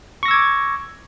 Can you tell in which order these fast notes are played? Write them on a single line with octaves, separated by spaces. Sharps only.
C#6 A#6 E6 G#6 D6